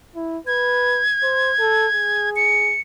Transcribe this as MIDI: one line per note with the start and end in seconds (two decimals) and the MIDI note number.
0.16 0.38 64
0.47 1.02 71
0.47 2.30 92
1.23 1.51 72
1.59 1.87 69
1.92 2.75 68
2.36 2.81 97